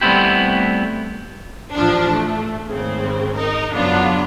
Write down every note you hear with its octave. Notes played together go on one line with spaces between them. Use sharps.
G3 A3 B3 C4 E4 G4
A1 F3 D4
A3
G#1 C#3 C4
D#4 A#4
F#2 C#3 F#3 B3 D4 F4